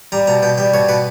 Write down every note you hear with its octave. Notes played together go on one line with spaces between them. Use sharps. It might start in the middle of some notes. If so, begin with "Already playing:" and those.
G3 A#5
B2 A#5
B2 G5
G3 G5
B2 C#5
B2 B4